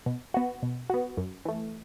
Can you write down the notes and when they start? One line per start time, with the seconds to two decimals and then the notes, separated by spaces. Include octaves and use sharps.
0.06 B2
0.34 B3 F#4
0.62 B2
0.90 B3 F#4
1.17 F#2
1.45 E3 A3